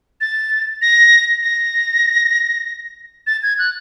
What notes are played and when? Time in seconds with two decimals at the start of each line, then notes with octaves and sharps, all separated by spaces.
0.21 A6
0.82 A#6
1.43 A#6
3.27 A6
3.43 G#6
3.59 F#6